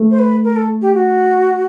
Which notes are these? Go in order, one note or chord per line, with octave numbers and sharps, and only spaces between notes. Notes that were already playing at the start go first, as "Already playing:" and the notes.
Already playing: A3
C5
B4
A#4
A4
G4
F#4